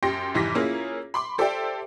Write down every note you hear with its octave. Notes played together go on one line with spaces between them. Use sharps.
F#2 G4 G5 C6 A#6
F1 G#2 E3 G4 A#6 B6
A#3 C#4 E4 F4 G#4
B5 C6 D6
G4 A4 C5 D5 E5 G5